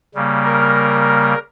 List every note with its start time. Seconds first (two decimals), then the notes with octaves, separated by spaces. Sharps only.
0.15 C#3 G3 A#3
0.44 A#4